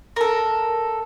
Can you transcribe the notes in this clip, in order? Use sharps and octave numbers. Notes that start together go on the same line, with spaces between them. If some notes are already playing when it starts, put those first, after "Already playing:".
A4 A#4